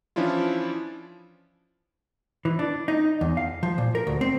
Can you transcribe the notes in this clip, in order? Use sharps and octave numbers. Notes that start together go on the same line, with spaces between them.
E3 F3 C#4 D4 E4 F4
E3
D4
D#4
E2
F5
F3
A#2
A#4
D2
C4